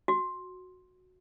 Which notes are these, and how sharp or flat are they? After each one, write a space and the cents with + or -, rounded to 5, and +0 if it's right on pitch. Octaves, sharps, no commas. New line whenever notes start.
F#4 -10